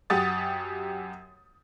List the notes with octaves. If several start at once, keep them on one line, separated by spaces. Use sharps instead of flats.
F#2 G4 F#5 D#6 A6